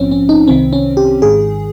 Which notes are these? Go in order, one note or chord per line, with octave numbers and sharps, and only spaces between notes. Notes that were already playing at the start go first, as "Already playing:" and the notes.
Already playing: A#1 G#2 F3 C4 C#4
C#4
D#4
C2 C3 D#3 C4
C#4
G4
G#1 G#2 D#3 G#4